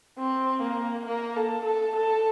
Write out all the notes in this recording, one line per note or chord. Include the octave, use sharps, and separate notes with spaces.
C4
A#3
A#3
A4
A4
A4